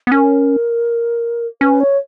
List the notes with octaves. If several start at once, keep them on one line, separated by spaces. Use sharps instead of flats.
B3
C#4 A#4
C#4 B4
C#5